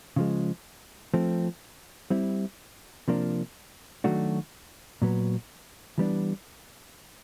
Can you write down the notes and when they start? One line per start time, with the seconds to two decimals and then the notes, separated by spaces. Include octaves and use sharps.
0.16 C#3 F3 G#3
1.14 F3 A3 C4
2.10 G3 C4 E4
3.08 C3 F3 A#3 D4
4.04 D#3 F#3 A3 D4 F#4
5.02 A#2 F#3 B3
5.98 E3 G3 B3 D4